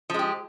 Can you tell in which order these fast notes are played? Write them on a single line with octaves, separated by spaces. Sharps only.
F3 G#3 G4